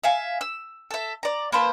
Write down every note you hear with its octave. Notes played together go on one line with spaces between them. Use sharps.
E5 F5 G#5
E6
A4 E5
D5 A#5
A#3 B4 C5 A5